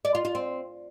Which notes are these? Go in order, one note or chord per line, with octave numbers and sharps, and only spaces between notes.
D5
F4
F4
C4